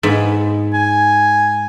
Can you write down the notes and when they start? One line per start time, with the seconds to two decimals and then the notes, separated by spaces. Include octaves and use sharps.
0.03 G#2 B3
0.74 G#5